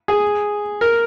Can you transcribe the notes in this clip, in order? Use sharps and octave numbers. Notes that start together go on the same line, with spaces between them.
G#4
A#4